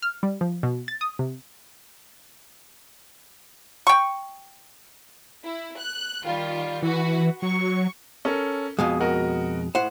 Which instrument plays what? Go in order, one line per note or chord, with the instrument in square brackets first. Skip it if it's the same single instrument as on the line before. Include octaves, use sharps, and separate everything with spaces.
[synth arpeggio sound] F6
G3
F3
B2
A6
D#6
C3
[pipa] G5 C#6
[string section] E4
F#6
D#3 G3 F4
[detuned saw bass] E3 [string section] F#4 B4
[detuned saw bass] F#3 [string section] C#6
[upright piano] C#4 A4 A#4
[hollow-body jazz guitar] F2 B2 G#3 [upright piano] F5 D#6
[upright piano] F#4 A#4 D#5
[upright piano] A2 [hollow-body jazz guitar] C5 F#5